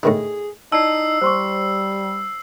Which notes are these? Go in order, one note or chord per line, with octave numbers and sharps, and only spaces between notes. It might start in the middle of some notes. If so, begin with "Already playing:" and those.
A2 D#3 D4 G#4
D#4 E4 D5 A5 E6 C7
G3 C5 C6 C#6